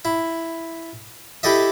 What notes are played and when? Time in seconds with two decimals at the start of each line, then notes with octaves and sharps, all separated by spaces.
0.05 E4
1.43 E4 G4 A4 D#5 E5